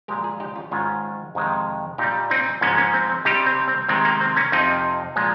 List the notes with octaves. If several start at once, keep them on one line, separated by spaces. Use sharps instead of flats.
A#2 F3 G#3 G4 A#4
F4 G#4
D#4 G4
C#4 F4
G#2 D#3 G#3 C#4 F4
F2 C3 D#3 G#3
A#2 G3 D#4 G4
C4 D#4
G#2 F3 G#3 A#3 C#4
A#3 C#4
C4
C4
C3 G3 D#4 G4
C4
C4
C3 D#3 G#3 C4
A#3
C4
A#3 C#4
F2 C3 F3 C4 D#4
A#2 F3 G#3